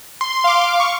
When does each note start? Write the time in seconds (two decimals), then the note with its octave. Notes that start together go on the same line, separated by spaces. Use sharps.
0.21 C6
0.44 F5 D6
0.80 C#6